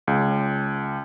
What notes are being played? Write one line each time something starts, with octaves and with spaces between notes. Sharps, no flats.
C#2